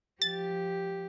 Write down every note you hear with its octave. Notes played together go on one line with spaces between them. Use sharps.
F3 G4 A6